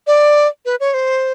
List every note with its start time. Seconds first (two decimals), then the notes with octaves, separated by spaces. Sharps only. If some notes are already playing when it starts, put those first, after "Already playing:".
0.07 D5
0.66 B4
0.80 C#5
0.94 C5